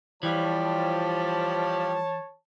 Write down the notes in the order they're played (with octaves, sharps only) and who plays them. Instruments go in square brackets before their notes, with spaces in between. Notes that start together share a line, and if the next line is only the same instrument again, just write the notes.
[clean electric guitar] E3 [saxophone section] F3 G3 [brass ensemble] C#5 A5